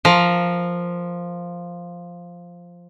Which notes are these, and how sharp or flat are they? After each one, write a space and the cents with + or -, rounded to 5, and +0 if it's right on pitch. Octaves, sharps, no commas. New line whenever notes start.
F3 +0 A#4 +0